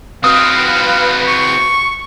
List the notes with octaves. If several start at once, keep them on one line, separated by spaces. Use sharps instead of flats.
C4 F#4 B4 F5 D#6
C#6